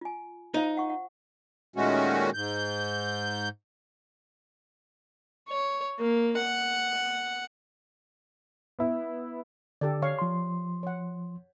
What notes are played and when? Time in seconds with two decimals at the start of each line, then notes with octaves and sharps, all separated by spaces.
0.01 F4 G#5
0.54 D#4 F4 C5 F5
0.77 F#5 C#6
0.90 F#5
1.76 A#2 D#3 G#3 A3 C#4 F#4
2.34 G#2 G6
5.49 C#5
5.99 A#3
6.37 F#5
8.79 B3 E4
9.81 D3 G4 A4 D5
10.02 C#5 F5 C#6
10.19 F3 C6
10.83 C#5 F#5